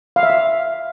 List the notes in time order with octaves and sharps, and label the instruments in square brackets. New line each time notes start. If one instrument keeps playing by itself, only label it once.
[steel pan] F5
E5
F5